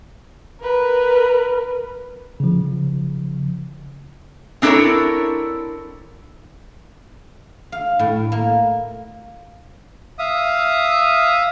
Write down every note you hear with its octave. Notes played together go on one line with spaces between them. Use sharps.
A#4 B4
C#3 F3
C4 D4 E4 A4 A#4 C#5
F5
A2
A#3
E5 F5 D#6